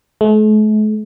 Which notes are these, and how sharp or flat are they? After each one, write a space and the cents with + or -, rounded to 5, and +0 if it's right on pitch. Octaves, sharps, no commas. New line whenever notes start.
A3 -45